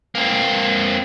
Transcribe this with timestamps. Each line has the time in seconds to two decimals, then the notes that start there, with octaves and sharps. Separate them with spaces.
0.15 A#3 C4